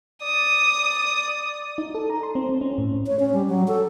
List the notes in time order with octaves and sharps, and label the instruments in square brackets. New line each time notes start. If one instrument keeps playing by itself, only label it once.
[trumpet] D5 [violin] D#6
[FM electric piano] D#4
A4
A#5
C6
C4
C4
C#4
A2
[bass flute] C#5
C#4
G3
F#3
A4